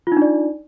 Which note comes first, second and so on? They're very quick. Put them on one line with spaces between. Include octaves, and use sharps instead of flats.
F4 D#4 D4 D5